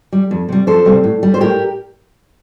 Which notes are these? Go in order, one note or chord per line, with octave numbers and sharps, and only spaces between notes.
G3
F2
C3 G3
F2 A4 C5
C3 G3
A2
G3
C5
A2 G4 A#4